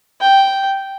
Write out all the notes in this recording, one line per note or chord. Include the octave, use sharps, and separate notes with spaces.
G5